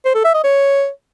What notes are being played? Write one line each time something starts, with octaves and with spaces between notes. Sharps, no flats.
C5
A4
E5
D#5
C#5